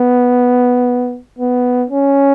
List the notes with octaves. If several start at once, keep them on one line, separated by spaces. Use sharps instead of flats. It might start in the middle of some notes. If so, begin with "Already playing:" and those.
Already playing: B3
B3
C#4